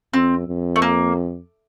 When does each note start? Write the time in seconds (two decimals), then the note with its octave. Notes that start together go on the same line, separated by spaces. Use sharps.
0.13 F2 C4
0.48 F2
0.76 A3
0.82 A#3